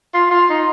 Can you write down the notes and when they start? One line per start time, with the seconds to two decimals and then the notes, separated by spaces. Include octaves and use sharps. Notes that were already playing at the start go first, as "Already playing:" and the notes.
0.14 F4
0.31 F4
0.49 D#4